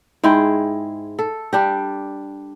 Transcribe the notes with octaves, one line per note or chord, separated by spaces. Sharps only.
G#2 G#3 E4 G5
A4
G3 D4 G4